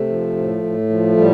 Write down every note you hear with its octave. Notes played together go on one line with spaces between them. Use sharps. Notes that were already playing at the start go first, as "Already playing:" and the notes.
Already playing: C3 A3
F3
A2
A2
F3
A2 G3